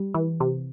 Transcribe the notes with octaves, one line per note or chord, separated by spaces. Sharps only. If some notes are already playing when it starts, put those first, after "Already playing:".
Already playing: G3
E3
C3